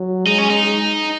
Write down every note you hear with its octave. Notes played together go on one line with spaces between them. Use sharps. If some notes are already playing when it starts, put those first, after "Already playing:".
Already playing: F#3
G#3 D#4
C#4
D#4